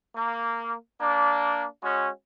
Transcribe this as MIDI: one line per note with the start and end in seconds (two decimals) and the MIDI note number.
0.16 0.73 58
1.00 1.65 58
1.00 1.65 62
1.83 2.09 56
1.83 2.09 61
1.83 2.09 66